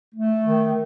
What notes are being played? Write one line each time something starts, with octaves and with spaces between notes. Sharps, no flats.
A3
D#3